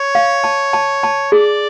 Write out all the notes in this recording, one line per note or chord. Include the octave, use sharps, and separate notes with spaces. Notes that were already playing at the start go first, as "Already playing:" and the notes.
Already playing: C#5
F5
A5
A5
A5
G#4 D5